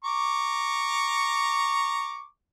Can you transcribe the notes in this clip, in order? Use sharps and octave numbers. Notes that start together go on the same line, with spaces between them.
A#5 C#6 D6